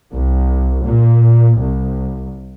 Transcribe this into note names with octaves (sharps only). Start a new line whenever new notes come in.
C2
A#2
C2